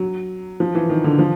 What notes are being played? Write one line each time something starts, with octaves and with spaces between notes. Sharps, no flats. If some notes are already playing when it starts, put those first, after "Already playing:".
Already playing: F#3
F3
E3
D#3
D3
F3